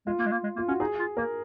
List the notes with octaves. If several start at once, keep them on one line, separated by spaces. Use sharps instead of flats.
G#3 F4
A#3
G#3
A#3
G#3
A#3 F4
C#4 F#4
D#4 G#4
F4
A#3 A#4